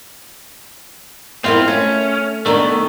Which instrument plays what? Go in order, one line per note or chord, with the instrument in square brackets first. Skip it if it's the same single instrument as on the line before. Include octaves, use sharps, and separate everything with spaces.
[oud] B3 E4 A#4 [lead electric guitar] C4 F4
[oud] A3 [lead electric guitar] C#4
[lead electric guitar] D#3 A3 [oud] B3 D4 A#4